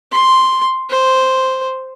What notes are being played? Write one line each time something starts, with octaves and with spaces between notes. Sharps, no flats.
C6
C5